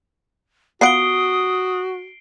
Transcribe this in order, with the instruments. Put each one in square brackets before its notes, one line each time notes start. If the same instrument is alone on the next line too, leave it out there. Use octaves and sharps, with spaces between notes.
[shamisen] B3 F4 F#5 [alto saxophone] F#4 [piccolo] D#6 [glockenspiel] C7 D7 G7